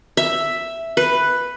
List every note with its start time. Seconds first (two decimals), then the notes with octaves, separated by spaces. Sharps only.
0.17 E5
0.97 B4